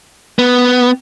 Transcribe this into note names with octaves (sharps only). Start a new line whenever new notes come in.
B3